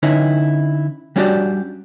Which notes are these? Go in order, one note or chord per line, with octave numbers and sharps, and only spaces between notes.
D3 C#4 D#4 E4 B4
G3 C#4 D4 F#4 G4 D5